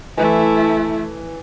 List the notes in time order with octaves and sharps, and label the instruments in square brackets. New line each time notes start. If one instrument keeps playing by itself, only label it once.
[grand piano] E3 [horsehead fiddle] A3 E4